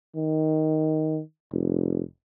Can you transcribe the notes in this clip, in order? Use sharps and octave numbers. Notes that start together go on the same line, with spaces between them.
D#3
F1